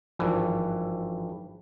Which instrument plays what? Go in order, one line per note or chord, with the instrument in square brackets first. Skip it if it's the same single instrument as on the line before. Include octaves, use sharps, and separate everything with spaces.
[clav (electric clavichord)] G#1 G2 E3 [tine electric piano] F3